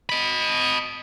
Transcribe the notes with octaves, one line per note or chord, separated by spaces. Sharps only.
D#5 B5